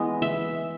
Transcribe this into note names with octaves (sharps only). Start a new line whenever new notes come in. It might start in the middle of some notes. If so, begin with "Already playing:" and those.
Already playing: E3 G#3 B3 D#5
E5